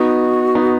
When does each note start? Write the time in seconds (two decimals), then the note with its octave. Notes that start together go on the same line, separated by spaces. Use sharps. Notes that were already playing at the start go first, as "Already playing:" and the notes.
Already playing: B3 D#4 F#4
0.55 B3 D#4